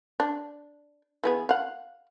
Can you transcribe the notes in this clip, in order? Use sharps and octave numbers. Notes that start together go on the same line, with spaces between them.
D4
E3 B3 G#4
F5 F#5